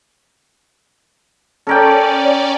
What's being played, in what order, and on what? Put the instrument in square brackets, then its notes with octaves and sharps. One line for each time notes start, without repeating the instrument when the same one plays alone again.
[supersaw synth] C#4 D5 [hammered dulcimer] A4 A#4 G5